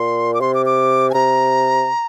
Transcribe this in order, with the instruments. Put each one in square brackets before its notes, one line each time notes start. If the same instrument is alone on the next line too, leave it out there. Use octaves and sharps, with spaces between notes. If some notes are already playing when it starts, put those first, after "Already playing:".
Already playing: [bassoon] A#2 [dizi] C6
[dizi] D6
[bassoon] C3 [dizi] C6
[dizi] D6
D6
G#5
[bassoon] C3 [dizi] A#5